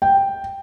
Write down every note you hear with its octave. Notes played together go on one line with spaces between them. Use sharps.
G5